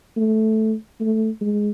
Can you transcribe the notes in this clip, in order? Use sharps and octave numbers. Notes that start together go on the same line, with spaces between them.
A3
A3
G#3